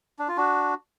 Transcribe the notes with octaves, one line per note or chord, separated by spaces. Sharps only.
D4
F4
D4 F#4